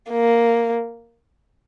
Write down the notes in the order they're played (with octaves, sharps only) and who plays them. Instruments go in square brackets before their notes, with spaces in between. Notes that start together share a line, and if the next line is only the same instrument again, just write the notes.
[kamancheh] A#3